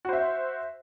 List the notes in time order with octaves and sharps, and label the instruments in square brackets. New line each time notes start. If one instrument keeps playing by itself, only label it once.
[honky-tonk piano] F#4
C5
E5